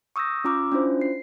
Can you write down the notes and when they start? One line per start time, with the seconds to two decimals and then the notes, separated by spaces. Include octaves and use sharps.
0.16 C#6 D#6 E6 G6 A#6
0.44 C#4 F4 A#5 D6 E6 F6
0.72 C#4 D4 E4 F4 C5
1.01 C7